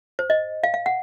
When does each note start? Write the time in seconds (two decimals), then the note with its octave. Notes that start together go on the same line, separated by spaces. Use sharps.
0.19 C5
0.30 D#5
0.64 F5
0.74 F5
0.86 F#5